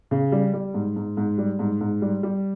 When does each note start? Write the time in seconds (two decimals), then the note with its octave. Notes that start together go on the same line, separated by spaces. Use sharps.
0.11 C#3
0.32 G3
0.53 G3
0.74 G#2
0.96 G#2
1.17 G#2
1.38 G3
1.59 G#2
1.81 G#2
2.02 G3
2.23 G3